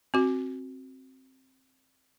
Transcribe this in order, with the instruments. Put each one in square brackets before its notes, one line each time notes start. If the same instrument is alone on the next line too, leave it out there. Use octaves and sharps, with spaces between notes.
[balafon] C4 F#4